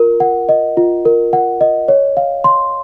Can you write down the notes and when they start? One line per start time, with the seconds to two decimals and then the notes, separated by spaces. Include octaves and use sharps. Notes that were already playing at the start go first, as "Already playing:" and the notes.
Already playing: F4 A#4
0.20 F#5
0.49 D#5
0.77 F4
1.05 A#4
1.33 F#5
1.61 D#5
1.88 C#5
2.17 F5
2.44 C6